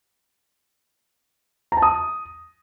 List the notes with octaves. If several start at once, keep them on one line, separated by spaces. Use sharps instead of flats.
A#5
A5
D#6